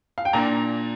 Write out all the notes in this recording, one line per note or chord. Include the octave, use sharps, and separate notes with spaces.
F5
G5
A#2 A#3 D4 A#5